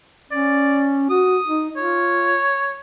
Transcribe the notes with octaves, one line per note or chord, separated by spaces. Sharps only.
C#4 D5
F#4 D#6
D#4
F4 C#5